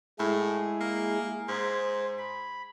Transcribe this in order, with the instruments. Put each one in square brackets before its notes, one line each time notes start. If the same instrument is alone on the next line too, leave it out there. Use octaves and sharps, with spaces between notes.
[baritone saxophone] A2 [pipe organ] G#3 E4 G#4
[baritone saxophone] A#3
[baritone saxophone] G#2 [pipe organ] C5
[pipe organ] B5